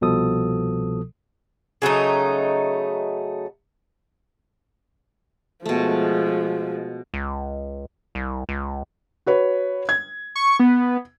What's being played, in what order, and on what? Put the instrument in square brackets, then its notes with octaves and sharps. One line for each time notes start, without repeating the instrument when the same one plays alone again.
[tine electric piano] C2 B2 F3 A4 D#6
[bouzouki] C#3 F#3 A3 D#4
[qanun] B2 A3 [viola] F3 G#3
[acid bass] C#2
C2
C#2
[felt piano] F#4 B4 C#5
G#6
[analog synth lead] C#6
B3